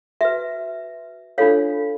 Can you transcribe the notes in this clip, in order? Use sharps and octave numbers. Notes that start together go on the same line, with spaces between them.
F#4 B4 E5
D4 F4 A4 C#5 F5